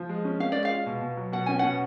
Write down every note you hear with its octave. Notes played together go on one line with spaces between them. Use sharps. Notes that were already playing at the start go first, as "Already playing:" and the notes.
Already playing: F3
G#3
C#4
C#4 F5
G#3 D5
F5
F4
B2
B2
F#3
B2 F#5
C#4 G#5
B2 F#5